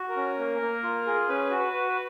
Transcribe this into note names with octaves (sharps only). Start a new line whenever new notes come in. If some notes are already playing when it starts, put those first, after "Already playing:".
Already playing: F#4
A#4
C#4
A#3
A#3
F4
G#4
C#4 B4
F#4
B4
F#4
B4